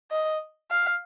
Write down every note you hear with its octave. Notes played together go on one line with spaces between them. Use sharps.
D#5
F5